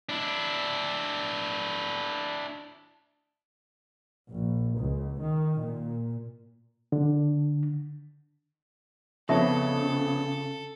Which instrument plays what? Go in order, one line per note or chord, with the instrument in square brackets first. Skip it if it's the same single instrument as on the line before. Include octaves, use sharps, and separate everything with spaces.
[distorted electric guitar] D4 E4
[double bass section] A#1
C#2
D#3
A#2
[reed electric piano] D3
[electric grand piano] F2 B3 C#5 [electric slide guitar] C#3 [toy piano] D#4 E5 [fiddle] A4